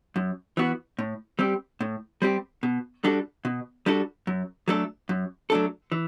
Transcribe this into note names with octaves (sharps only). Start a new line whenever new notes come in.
F#2
E3 B3 F#4
A2
G3 C4 G4
A2
G3 C4 G4
B2
G3 D4 F#4 A4
B2
G3 D4 F#4 A4
F#2
F#3 A3 D4 A4
F#2
F#3 A3 D4 A4
E3